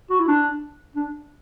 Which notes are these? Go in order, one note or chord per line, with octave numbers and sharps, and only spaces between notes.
F#4
E4
D4
D4